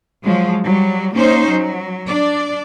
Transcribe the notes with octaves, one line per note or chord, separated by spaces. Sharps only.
F3 F#3 G#3
F#3 G3
A#3 C#4 D#4 C5
F#3
D4 D5